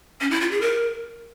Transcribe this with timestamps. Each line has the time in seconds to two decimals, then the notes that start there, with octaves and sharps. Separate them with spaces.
0.21 C#4
0.31 E4
0.41 F4
0.51 G#4
0.61 A#4